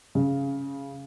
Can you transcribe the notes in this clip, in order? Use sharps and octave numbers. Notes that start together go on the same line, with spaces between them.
C#3